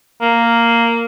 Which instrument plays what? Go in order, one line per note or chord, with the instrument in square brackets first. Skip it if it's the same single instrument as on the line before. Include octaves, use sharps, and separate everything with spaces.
[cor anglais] A#3